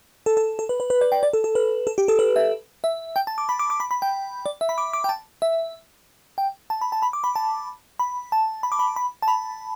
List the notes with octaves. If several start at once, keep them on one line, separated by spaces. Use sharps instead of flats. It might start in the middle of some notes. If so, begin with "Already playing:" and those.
A4
A4
A4
B4
B4
B4
D5
G5
D5
A4
A4
B4
A4
G4
A4
B4
E5
E5
G5
A5
D6
B5
D6
D6
B5
B5
G5
D5
E5
B5
D6
D6
G5
A5
E5
G5
A5
B5
A5
B5
D6
B5
A5
B5
A5
B5
D6
B5
B5
A5
B5